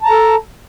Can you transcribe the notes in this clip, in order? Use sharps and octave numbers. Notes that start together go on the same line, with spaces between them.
A4 A5 A#5